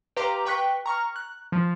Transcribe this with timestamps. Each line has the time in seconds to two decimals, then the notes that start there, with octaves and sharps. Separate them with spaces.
0.16 G4 B4 F5 A#5 C6 D6
0.45 B4 G5 C#6 F#6 B6
0.86 A#5 C#6 F6
1.16 F#6
1.52 F3